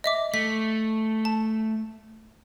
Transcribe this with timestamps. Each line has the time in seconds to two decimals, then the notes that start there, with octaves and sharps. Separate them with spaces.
0.04 D#5 E5 D6
0.34 A3 B6
1.25 A5